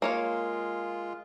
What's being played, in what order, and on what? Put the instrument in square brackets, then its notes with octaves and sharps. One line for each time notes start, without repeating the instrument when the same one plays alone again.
[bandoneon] G#3 F4 [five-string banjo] A#3 C#5 F5